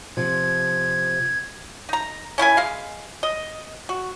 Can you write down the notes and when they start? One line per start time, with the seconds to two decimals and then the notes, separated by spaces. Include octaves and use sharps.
0.17 C3 F3 G#6
1.89 D#4 A#5
2.38 C#4 E4 A#4 G#5
2.57 G#3 F5
3.23 D#5
3.89 F#4